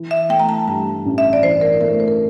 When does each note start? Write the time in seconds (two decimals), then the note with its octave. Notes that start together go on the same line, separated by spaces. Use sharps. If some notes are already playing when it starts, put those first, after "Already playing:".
Already playing: E3
0.11 E5
0.29 A3 G5
0.40 A#5
0.49 A5
0.67 G2 A5
1.06 A1
1.18 E5
1.33 D5
1.43 E3 C5
1.61 A#4
1.81 A3 A#4
2.00 C5
2.08 A#4